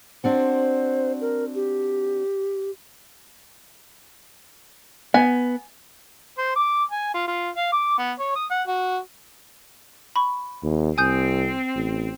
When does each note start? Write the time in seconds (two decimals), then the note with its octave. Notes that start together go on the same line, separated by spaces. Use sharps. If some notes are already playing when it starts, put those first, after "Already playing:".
0.24 C4 D4 F#4 C5
1.21 A#4
1.55 G4
5.14 B3 G#5
6.38 C5
6.56 D6
6.92 G#5
7.14 F4
7.28 F4
7.57 F5
7.72 D6
7.98 B3
8.19 C#5
8.35 D#6
8.51 F#5
8.67 F#4
10.16 B5 C#6
10.63 D#2
10.98 C2 C4 G#5 D#6 G6
11.76 A1